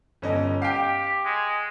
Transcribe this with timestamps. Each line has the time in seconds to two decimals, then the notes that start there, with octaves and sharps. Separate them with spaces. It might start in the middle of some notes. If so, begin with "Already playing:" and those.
0.22 G1 C#4 D#5
0.62 G4 F5 G5
1.25 G#3